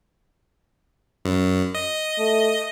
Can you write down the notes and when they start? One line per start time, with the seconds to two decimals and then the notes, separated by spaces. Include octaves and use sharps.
1.25 F#2
1.74 D#5
2.18 A3